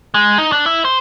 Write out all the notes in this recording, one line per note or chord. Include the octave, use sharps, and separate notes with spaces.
G#3
D#4
D4
E4
C5